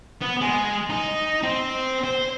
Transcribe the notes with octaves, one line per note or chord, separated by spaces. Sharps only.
B3
G#3
D#4
C4
C5